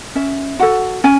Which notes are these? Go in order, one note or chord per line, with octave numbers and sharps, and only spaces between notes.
C#4 E5
F#4 A4 F#5
C#4 G#5